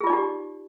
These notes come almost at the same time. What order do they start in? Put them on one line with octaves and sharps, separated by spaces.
G#4 F4 D5 D#4 G4